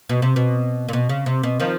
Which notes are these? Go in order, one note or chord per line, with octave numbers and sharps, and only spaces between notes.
B2
C3
B2
A#2
B2
C#3
C3
B2
D#3 F3